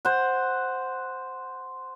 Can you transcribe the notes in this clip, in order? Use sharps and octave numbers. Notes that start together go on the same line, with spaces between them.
C5 F#5